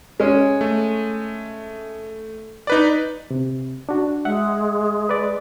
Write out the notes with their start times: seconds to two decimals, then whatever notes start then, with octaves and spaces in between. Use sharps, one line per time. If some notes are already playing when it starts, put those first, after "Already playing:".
0.20 G#3 C#4
0.61 A3
2.67 D#4 B4 D5
3.31 C3
3.89 D4 F#4
4.25 G#3 E5 F#5
5.09 B4 D5